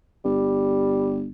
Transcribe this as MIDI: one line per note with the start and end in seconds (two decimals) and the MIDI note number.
0.25 1.30 31
0.25 1.21 55